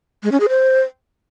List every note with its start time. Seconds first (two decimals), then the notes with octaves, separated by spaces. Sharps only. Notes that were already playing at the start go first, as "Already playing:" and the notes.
0.23 G#3
0.32 C#4
0.40 G#4
0.49 C5